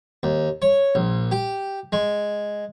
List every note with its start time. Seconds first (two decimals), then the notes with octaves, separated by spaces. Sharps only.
0.23 D#2
0.62 C#5
0.95 A#1
1.31 G4
1.92 G#3